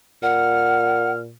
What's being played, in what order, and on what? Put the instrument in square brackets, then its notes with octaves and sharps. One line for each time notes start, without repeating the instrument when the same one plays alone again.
[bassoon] A#2 [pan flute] F#5 [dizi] F6